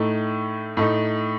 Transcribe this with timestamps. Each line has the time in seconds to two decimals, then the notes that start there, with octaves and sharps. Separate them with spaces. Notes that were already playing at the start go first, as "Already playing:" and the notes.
Already playing: A2 A3 D#4
0.77 A2 A3 D#4